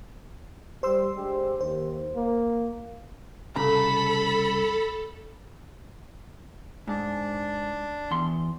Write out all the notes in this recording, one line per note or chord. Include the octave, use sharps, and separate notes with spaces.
G3 C5 C6 E6
G#3 D4 G4
D#2 C5
A#3
C2 C#3 A4 A#5 B5
G#2 D4
E2 C6